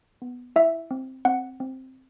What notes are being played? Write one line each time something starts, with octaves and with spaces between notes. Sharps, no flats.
B3
E4 E5
C4
C4 F#5
C4